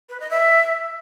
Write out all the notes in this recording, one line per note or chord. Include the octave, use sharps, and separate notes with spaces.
B4
D#5
E5